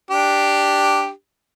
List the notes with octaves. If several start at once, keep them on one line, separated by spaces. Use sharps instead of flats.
D4 G4